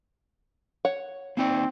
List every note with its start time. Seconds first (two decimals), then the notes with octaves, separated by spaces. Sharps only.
0.85 C#5 F#5
1.37 A#3 C4 D#4 D5